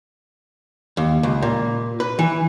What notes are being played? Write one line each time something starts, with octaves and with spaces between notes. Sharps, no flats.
D#2
C#2
A#2
B4
E3